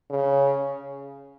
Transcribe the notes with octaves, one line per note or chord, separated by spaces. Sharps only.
C#3